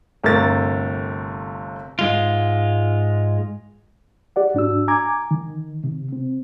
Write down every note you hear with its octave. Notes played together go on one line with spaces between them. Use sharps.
G1 C3 A3 A#4 A6
G#2 G#3 F4
G4 D5 F#5
G#2 D4 F#4 E6
G#5 A#5 D6 G#6
D#3
C3
C4